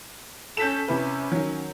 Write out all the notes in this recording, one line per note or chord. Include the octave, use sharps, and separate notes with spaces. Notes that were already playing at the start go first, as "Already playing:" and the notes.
C#4 A4 G6 B6 E7
C3 C#4 E4 B4
D#3 F#3